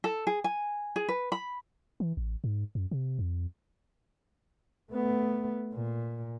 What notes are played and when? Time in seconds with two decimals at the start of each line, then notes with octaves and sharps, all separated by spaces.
0.04 A4
0.27 G#4
0.44 G#5
0.96 G#4
1.09 B4
1.32 B5
2.00 E3
2.17 A1
2.44 G#2
2.75 F#2
2.91 C3
3.19 F2
4.92 A3 B3
5.74 A#2